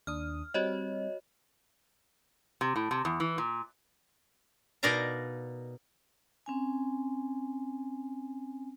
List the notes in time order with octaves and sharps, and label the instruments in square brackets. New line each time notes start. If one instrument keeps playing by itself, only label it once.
[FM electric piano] D#2 D4 D#6 [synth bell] F6
[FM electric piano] G3 C4 [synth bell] F#4 C#5 D#5
[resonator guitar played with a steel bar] C3
A2
C3
E2
E3
A#2
[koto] B2 D#4 A#4 D5 F5 A#5
[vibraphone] C4 C#4 G#5